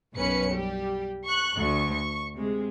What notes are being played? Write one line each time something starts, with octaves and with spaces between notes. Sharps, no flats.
B1 F#2 C#4 B4 C#7
G3 G4
C#6 F#6
D2 C#6
C#6
C3 G#3